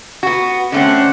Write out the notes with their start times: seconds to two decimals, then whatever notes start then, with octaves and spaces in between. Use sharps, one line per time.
0.23 B3 F#4
0.72 D3 A3 C4 C#4 F#5